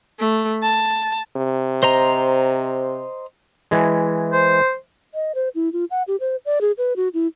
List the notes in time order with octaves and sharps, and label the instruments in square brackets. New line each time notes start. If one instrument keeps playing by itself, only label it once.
[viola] A3
A5
[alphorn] C3
[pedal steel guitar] C5 D#5 A#5
[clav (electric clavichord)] E3 G#3
[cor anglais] C5
[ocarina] D#5
C5
E4
F4
F#5
G4
C5
D5
G#4
B4
F#4
E4